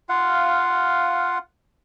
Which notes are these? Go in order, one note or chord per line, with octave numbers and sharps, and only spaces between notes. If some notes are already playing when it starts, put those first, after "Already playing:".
F4 F5 F#5